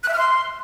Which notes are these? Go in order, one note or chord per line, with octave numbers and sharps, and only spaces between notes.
F#6
E5
F6
C6